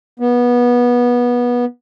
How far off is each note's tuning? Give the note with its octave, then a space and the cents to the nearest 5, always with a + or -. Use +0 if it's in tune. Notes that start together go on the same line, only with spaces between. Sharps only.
B3 -20